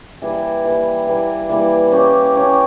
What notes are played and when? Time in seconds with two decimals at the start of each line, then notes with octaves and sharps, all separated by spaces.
0.22 E3 G3 A#3 E4
0.65 E3 G3 A#3 E4
1.07 E3 G3 A#3 E4
1.49 E3 G3 A#3 E4
1.92 A#3 C#4 G4 C#5
2.35 A#3 C#4 G4 C#5